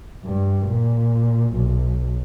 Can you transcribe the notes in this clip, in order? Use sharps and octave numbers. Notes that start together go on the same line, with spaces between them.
G2
A#2
B1